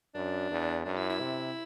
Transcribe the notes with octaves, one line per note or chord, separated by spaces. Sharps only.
F#2 D4
E2
F#2 D4
E4
E4
C3